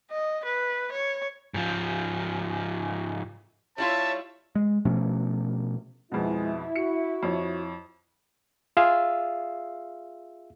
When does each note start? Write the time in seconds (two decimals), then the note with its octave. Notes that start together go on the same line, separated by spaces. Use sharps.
0.11 D#5
0.45 B4
0.92 C#5
1.54 G#2 F3
3.78 G3 E4 F4 C#5 E5 A5
4.55 G#3
4.85 B2 F3 A3 C#4
6.12 F2 B2 G#3 E4
6.76 F#4 C#7
7.23 F2 C#5
8.77 F4 G#4 E5 F5 E6